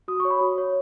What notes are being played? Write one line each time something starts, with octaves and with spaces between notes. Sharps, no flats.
F#4 D#6
C#6
C#5
B5
F#4
C#5